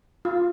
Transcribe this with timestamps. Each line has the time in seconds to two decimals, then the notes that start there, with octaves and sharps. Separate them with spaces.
0.25 F4